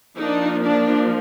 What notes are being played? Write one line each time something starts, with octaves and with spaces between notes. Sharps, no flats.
F3 A#3 D4 D#4
D4